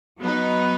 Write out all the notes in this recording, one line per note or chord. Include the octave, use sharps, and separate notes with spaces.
F#3 B3 D#4